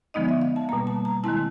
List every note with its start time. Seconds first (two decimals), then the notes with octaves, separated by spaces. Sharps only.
0.14 D3 F3 G#3 B3 D#4 D#5
0.29 E5
0.42 F5
0.56 A5
0.69 B2 G3 A#3 A#5
0.87 A5
1.05 A#5
1.24 D#3 G#3 C4 E4 A5